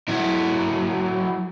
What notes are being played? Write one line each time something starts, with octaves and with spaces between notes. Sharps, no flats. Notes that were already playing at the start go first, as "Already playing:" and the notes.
F#3 E4